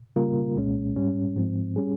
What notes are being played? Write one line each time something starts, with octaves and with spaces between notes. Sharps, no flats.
C#3 G3 A#3 F4 A#4
C2 A#2 G#3 C#4
G#2 G3 C#4
G#2 F3 C4
G3 C#4 G#4